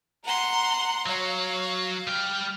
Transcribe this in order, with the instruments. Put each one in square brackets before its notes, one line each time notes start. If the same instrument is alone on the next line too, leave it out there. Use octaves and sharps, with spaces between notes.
[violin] F#5 C6 [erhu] A#5
[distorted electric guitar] F#3 [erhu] C#5 [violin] F5
[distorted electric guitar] G3 G5 [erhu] F6